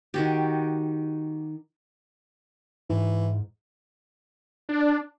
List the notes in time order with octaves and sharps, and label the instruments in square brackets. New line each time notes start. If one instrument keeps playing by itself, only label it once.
[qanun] D#3 F#4 G4
[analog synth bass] G#2 [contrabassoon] E3
[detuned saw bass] D4